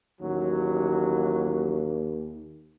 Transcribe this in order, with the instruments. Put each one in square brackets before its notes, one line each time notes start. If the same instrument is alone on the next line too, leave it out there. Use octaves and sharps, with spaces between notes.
[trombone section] A1 F#3 [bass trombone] D#2